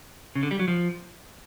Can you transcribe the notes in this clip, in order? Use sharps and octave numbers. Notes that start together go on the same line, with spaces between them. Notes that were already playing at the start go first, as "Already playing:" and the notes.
C#3
D3
G3
F#3
F3